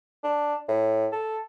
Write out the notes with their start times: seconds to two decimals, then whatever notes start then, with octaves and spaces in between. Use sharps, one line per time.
0.24 D4
0.69 A2
1.12 A4